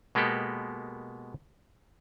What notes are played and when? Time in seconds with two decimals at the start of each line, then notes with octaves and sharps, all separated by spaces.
0.15 B2 G#3 A#3 B3 G4 A4